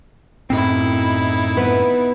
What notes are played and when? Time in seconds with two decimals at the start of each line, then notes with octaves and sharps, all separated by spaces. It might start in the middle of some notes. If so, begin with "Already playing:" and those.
0.50 F#2 A2 C4 D#4 E4
1.57 B3 B4